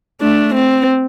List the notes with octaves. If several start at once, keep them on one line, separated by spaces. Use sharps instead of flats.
A3 D4
C4